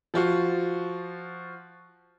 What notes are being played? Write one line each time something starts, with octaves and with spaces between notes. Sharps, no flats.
F3 F4 F#4